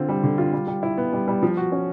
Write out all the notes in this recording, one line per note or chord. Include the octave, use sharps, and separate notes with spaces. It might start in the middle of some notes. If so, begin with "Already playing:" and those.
Already playing: D3 C4 F4
G3
D3
F4
G3
G3
E4
B3
G3
G3
F3
F#4
C#4